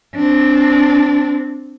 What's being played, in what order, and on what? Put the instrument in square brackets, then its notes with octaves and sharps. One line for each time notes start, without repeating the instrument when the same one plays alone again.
[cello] C4 D4